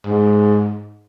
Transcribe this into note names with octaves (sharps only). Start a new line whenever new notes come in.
G#2